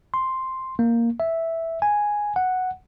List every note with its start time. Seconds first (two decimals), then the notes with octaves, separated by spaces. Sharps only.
0.14 C6
0.79 A#3
1.20 E5
1.82 G#5
2.36 F#5